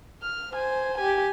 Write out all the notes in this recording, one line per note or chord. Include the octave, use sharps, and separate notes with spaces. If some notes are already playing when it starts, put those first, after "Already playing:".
F6
C5 G#5
G4 G#5